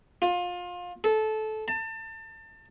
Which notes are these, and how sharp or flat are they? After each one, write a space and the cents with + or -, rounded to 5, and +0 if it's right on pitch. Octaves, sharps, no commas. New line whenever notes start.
F4 +25
A4 -20
A5 +30